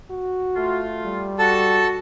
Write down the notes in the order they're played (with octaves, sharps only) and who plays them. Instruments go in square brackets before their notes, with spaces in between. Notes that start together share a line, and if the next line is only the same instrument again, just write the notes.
[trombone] F#4
[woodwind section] A3 F4
[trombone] G3
[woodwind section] F#4 [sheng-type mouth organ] A4 A5